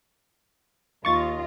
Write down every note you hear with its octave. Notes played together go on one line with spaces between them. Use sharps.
D#2 F4 D#5 C#6 A6